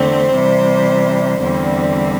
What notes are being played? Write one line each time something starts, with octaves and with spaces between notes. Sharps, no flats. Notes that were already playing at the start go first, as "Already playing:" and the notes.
Already playing: E2 D3 A3 C4 C5
C3 E3 G3
E2 D3 G3 C4